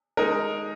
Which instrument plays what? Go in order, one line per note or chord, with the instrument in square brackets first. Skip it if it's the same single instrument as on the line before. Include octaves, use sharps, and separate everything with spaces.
[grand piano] G#3 D#4 A#4